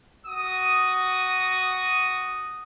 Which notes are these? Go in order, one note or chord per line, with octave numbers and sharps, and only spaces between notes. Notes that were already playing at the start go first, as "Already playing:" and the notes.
F#4 D#6